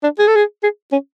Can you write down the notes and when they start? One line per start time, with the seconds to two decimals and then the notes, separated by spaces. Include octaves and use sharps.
0.03 D4
0.19 G#4
0.28 A4
0.36 G#4
0.63 G#4
0.92 C#4